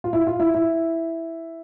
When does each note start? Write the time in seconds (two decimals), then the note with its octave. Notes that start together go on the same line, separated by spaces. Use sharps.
0.04 F4
0.13 E4
0.27 F4
0.40 E4
0.54 E4